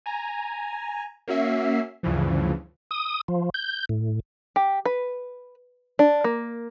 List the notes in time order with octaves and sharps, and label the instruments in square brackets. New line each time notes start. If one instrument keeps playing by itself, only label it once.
[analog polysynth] G#5 A#5
A#3 C#4 F#4 E5 C7
D2 G2 C#3 E3 F3
[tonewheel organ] D#6
F3
G6
A2
[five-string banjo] G4
B4
D4
A#3